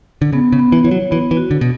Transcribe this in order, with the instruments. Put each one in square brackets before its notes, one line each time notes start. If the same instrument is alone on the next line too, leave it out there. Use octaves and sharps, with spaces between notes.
[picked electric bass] D3
[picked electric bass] C#3 [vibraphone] B3
[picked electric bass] C#3
[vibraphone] B3
[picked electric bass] E3
[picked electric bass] E3 [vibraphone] C#5
[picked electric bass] F#3
[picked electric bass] E3 [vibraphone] B3
[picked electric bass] E3
[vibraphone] F#4
[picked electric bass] D3
B2